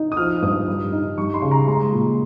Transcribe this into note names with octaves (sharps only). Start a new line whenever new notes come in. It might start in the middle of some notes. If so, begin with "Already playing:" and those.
Already playing: D#4
D#6
F3 F6
G2 D#6
G3
D#4
G3 C#6
C6
C#3
A#5
G#3 C6
A#2